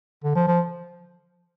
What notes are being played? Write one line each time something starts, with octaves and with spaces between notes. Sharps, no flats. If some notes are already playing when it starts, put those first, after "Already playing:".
D3
F3
F3